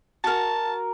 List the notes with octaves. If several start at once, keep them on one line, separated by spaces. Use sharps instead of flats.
F#4 A#4 A5